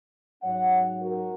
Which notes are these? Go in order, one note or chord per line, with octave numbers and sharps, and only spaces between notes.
G#2 F#3 C#4 C#5 F#5
F#4 A#4